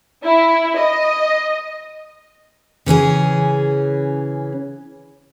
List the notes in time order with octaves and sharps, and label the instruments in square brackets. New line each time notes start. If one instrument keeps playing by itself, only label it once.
[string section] E4
D#5
[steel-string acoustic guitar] C#3 E3 C#4 G#4